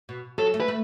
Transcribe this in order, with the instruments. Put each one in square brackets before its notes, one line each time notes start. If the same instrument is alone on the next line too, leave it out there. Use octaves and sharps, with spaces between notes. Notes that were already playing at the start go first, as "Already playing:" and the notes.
[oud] B2
[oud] F#3 [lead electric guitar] A4
[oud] A3
[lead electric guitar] B4
[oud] A3